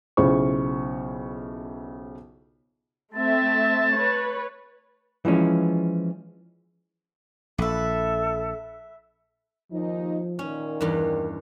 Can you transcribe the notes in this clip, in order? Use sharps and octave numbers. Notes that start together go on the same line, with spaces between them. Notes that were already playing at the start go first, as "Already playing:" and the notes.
B1 C#3 E4 F4 C5 C#6
A3 C4 E5 A5
B4 C#5
E3 F3 G#3 C#4
A#1 A4 B4 E5
D#2 F3 D#4
A#2 D#3 C#4
E2 G2 A#4